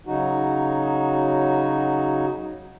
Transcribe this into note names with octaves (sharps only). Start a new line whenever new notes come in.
C#3 F#3 D#4 F#4